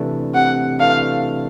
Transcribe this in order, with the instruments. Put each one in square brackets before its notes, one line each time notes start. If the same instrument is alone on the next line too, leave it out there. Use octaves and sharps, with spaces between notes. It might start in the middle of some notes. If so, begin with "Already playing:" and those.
Already playing: [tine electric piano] C3 E3 A3 D4
[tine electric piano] C3 [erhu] F#5
[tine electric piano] E3 A3 D4 [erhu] F5